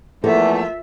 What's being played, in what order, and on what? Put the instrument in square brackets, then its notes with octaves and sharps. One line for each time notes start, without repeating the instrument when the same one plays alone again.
[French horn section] E2 E3 A3 [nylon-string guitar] F3 A#3 A4 [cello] F4 E5